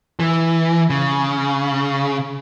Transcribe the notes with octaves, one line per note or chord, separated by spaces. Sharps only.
E3
C#3